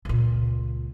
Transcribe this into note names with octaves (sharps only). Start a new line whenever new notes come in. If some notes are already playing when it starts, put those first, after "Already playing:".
C#2 A#2